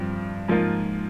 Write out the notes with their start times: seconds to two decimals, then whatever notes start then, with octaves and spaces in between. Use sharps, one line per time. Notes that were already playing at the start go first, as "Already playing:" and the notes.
Already playing: G2 F3 C4
0.48 G#2 F3 A#3 F4